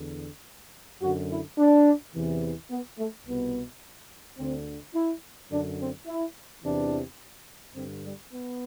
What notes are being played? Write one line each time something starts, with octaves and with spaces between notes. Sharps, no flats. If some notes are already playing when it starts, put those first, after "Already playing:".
Already playing: E2 D3
F#2 D3 F#4
E4
D4
E2 C3 E3
B3
A3
C2 B2 B3
D2 D3 C4
E4
F#2 D3 D4
C4
E4
E2 C3 E3 D4
G2 D3 C4
G3
B3